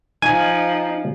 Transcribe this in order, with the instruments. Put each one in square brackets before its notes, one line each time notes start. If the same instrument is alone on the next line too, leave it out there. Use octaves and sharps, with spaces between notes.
[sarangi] F3 [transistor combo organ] D#4 [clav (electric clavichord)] G#5